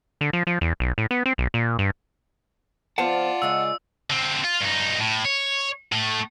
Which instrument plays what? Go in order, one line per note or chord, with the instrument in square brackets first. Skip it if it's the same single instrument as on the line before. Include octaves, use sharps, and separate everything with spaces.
[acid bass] D3
F3
F3
E2
B1
A2
B3
C4
B1
A#2
G2
[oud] F3 B3 C4 [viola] F4 D5 [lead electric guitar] F#5 A5
[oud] C#3 G#3 D#5 [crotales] E6
[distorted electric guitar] D3 C4
F4
G2 D#4
A2
C#5
A2 A3